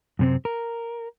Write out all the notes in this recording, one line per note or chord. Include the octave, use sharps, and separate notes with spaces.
F#2 C3 C4
A#4